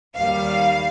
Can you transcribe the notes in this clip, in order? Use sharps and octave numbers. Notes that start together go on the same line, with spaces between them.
D#2 D#3 G3 F5